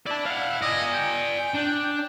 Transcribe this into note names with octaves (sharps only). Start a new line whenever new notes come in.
E4 D5 A5
F5 F#5
D5 D#5 G#5
G5
D4